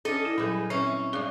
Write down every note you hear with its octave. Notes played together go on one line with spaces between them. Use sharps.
C#4 D4 G#4 A4 D#5
E4
A#2 F#3 G3 G#4 B4
C4 C#4 E4
G2 G#3 G#4 D5